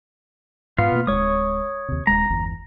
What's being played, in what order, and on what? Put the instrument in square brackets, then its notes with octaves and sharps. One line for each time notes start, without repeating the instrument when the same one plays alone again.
[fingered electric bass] G#2 [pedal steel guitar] B3 F4 F5
[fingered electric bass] B2 A#3
[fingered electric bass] D1 G1 G#3 [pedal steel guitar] C#5 D#6
[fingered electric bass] D#2 C3
[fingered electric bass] D#1 E2 G#3 [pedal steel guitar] A#5
[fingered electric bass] G1 E2